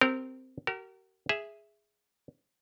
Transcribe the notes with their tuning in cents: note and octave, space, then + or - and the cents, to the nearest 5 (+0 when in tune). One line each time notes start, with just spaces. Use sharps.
C4 -10 G4 -15 A#4 -20
F#4 +45 A#4 -20
G#4 +0 E5 +0